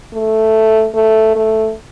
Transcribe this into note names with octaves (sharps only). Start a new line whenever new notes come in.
A3
A3
A3